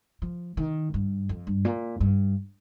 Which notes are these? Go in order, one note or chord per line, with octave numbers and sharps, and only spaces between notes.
F3
D#3
G2
F2
G2
A#2
G2